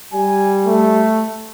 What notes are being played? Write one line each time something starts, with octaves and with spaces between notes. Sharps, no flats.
G3 G#5
A3